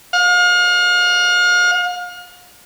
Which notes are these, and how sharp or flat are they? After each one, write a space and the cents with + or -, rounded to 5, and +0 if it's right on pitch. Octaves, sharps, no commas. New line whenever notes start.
F5 +35